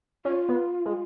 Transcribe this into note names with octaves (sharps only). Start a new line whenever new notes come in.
C#4 F4
B3
G#3